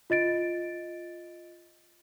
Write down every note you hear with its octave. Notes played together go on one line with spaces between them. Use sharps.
F4 D#5 A6 D7